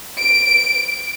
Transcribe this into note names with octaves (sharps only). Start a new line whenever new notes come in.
D7